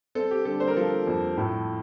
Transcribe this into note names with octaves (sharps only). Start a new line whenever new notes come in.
C4 A4
G4
D3 A4
C5
A#4
F3 A4
F2
A2